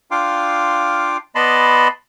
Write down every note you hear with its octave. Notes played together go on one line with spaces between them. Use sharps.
D4 F4 F5 G5 C6 D6
B3 D5 D#5 A5 B5 C6